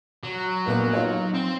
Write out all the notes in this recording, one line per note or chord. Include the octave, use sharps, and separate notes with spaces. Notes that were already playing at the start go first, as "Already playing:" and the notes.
F#3
A#1 A#3 B3
D#4 F4 C#5
C4